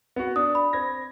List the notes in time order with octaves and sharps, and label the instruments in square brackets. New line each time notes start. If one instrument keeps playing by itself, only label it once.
[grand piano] B3 F#4
[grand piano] D4 [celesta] D#6
[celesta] B5
[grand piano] C4 G#6 A#6